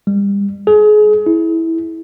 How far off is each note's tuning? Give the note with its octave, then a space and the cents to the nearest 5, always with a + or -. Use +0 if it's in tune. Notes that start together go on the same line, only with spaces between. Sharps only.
G3 +35
G#4 +30
E4 -10